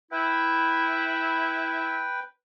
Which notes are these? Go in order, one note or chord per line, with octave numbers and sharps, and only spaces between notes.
E4 B4 G5